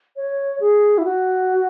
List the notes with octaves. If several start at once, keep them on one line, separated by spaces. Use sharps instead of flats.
C#5
G#4
E4
F#4